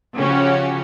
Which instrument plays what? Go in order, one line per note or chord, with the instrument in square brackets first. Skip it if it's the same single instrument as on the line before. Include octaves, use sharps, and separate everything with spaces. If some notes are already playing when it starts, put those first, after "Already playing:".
[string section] C#3 F3 C#4 F#4 G4